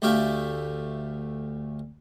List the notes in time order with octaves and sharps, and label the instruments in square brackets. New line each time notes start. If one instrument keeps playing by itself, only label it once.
[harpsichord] D2 A3 G4 E5 F5